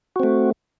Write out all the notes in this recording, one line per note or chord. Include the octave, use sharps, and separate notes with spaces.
A3 C4 F#4